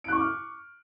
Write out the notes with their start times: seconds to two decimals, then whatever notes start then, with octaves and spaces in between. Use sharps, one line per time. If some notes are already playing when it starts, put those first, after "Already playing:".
0.04 D7
0.08 F#6
0.12 C#6
0.16 D6
0.20 F6